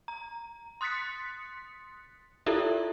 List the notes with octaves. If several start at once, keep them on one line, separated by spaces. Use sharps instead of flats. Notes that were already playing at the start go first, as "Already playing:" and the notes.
A#5
C6 D#6 F#6 A6 B6 C#7
E4 F4 G4 A4 A#4 E5